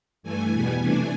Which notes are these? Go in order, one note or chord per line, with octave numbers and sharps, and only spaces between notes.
G2 E3 A3 G#5
E2 B2 G3 B3
C3 E3 A3 D4